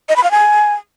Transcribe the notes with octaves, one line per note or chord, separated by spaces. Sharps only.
D#5
B5
F5
G#5